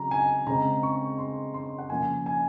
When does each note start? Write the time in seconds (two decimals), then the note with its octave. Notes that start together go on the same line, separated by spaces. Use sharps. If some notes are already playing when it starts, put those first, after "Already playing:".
Already playing: C#3 F#3 C4 A#5
0.11 G#5
0.47 C#3 G#3 C4 A#5
0.83 C#6
1.19 C6
1.54 C6
1.78 F#5
1.90 C#3 F3 A#3 C#4 G#5
2.26 G#5